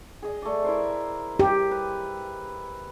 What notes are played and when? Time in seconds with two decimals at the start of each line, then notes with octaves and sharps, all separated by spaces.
0.22 G#4 D#5
0.42 A3 D5
0.64 E4 A#4 C5
1.39 G4
1.71 B4